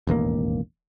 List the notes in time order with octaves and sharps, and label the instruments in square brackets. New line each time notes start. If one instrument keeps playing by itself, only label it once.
[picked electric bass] E1 A1 D#2 A#3